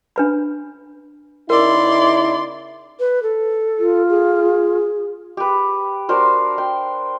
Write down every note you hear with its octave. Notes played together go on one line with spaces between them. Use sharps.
D4 B4 B5
C#3 D#4 E4 A#4 D5 C6
B4
A4
F4
G#4
G4 B4
D4 F#4 A#4 C5
G5 C6